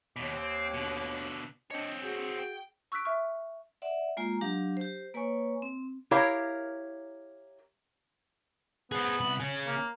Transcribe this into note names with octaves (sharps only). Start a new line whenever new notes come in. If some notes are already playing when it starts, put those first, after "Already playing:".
D#2 B2 D#3 C#5 D6
C4
B2 D3
C4 D4 C#5 D#5
F#4 G#4
G5
C#6 E6 F#6 B6 D7
E5 C#6 F6
D5 E5 F#5
G#3 A#3 F4 G#5 A#5
F#3 D4 G4 F5
G4 C5
A#3 B4 C#5 G#5 C#6
C4
E4 G4 A#4 C#5 F5 A#5
B3 G#4 C5
C2 B5
C#4 G#4
A#3